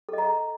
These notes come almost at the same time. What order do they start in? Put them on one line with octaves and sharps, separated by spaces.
A4 D#5 A#5